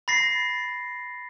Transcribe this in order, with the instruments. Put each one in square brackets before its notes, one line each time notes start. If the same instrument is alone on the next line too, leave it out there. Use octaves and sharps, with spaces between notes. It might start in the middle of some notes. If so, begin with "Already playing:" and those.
[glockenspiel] B5 A6 A#6 C7